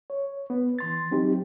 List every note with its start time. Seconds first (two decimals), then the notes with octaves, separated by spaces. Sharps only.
0.10 C#5
0.50 B3
0.79 E3 C6 A6
1.11 F#3 C4 D#4 G4